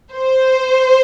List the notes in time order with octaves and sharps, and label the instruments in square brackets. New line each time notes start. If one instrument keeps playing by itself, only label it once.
[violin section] C5